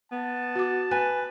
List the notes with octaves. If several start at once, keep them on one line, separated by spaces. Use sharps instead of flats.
B3 A5
F#4 D6
B4 G#5